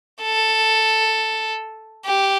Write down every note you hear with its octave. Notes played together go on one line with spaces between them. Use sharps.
A4
G4